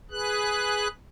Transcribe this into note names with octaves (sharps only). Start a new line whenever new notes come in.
G#4 B4 F#6